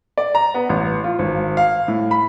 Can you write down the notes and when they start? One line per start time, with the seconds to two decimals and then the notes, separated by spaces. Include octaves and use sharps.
0.18 D5
0.35 A#5
0.54 B3
0.69 A1
1.04 F4
1.19 G#1
1.57 F5
1.88 A2
2.11 B5